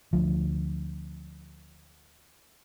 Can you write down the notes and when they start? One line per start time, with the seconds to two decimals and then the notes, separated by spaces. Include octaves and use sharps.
0.13 D2 F3